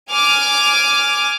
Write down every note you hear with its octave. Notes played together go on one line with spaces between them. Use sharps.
G#5 D6 F6